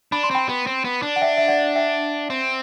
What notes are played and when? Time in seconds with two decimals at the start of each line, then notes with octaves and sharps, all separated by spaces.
0.12 D4 B5
0.23 C6
0.31 C4 G5 B5
0.49 B3
0.67 C4
0.85 B3
1.02 D4
1.16 F#5
1.21 E5 G5
1.37 E5
1.48 D5 F#5
1.76 E5 G5
2.30 C4